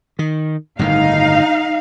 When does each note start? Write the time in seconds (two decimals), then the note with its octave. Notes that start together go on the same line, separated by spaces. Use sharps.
0.19 D#3
0.79 G1 A2 D#3 D#4 F5